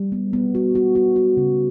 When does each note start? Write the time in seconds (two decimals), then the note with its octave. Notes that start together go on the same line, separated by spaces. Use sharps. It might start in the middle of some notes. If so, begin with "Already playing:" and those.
Already playing: G3
0.12 B3
0.33 B3
0.55 F#4
0.75 F#4
0.95 F#4
1.16 F#4
1.37 C#3